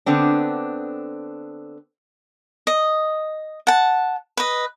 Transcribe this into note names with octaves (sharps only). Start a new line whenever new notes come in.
D3 B3 C4 D4
D#5
F#5 A5
B4 D#5